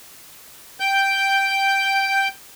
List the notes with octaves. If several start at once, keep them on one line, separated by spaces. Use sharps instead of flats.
G5 G6